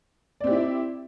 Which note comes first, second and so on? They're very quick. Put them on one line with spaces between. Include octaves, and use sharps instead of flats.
D5 C4 G4 E4 E5